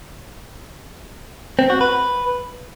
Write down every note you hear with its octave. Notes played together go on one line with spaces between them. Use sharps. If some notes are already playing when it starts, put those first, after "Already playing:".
C4
F#4
B4